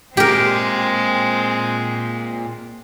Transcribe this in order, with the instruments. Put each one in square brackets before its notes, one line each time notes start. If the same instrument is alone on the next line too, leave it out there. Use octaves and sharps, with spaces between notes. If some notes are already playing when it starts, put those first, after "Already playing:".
[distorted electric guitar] A#2 [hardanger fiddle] G#3 C4 [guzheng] G4 A#4